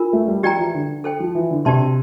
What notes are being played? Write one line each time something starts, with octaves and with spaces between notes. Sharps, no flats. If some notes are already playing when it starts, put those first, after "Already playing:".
Already playing: D4 F4 A#4
A3
G3
F3 G4 D5 G5 A#5
E3
D3
A4 C5 G5
F3
E3
D3
C3 G4 D5 A5 C6